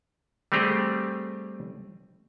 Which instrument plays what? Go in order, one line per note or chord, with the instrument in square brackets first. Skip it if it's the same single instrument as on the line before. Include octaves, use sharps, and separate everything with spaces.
[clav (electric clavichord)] G3 A3 C4 G4 G#4